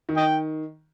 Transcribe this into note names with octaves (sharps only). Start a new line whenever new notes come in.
D#3
D#5 G5